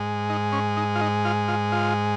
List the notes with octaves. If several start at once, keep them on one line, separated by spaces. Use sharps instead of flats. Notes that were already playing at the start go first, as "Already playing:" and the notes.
Already playing: G#2 G#3
D#4
C#4
D#4
F4
D#4
F4
F4
F4